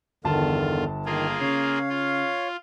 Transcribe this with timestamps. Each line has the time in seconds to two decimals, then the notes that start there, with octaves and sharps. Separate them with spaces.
0.24 G1 E2 D3 D#3 F4 A5
1.05 D#3 A#3 F4 G#4
1.41 C#3 C#5 F5
1.89 F4